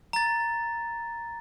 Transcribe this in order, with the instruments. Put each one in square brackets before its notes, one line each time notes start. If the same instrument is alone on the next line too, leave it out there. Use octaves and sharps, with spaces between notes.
[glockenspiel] A#5 A6